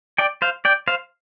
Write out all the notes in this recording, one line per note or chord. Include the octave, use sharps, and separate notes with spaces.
D5 G5
C5 F5
D5 G5
C5 F5